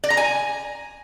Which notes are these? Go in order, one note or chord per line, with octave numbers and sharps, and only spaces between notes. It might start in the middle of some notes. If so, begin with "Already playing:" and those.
D5
A#5
G#5